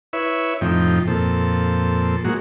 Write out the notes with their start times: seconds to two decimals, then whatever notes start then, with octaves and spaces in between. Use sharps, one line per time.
0.13 E4 B4 C#5 E5
0.61 F2 A2 C3 F3 D#4 G5
1.07 F2 A#2 C4 A4
2.25 A2 F#3 G#3 A#3 F#4